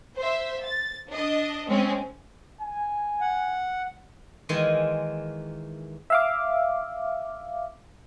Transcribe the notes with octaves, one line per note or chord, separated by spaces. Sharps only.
C5 E5
A6
D4 D#5
G#3 C4 C#4
G#5
F#5
D#3 E3 G#3 A#3 G#5 C6
E5 F5 D6